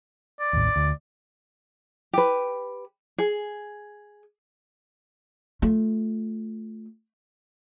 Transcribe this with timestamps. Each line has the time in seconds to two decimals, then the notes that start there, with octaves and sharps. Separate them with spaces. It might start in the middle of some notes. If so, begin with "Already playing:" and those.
0.40 D5
0.53 A1 D#2
0.76 D2
2.13 G4 B4
3.18 G#4
5.62 A3 F4